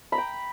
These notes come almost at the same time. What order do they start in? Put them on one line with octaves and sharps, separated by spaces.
B5 A#5 G5